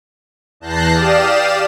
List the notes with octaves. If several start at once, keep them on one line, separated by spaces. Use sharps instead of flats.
E2 A5 F#6 G6 A#6 C7
G4 D5 F5 D#6 E7